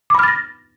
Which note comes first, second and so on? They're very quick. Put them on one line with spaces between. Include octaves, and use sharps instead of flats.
D6 B5 F6 A6 A#6